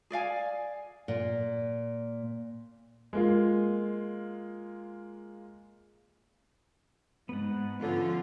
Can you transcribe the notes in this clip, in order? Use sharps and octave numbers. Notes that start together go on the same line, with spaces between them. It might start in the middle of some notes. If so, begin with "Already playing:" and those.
G#4 D5 F5 G#5
A#2
G#3 A#3 F4
G#2 B3 F#5
D3 F3 C#4 F4